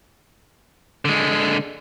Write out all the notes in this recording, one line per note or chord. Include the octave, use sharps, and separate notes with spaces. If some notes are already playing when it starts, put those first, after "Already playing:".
D3 G#3